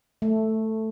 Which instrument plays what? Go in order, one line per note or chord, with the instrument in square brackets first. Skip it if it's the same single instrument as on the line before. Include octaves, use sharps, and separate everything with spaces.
[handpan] A3